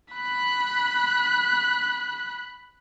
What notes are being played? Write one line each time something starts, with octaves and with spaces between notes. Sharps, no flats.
B5 F#6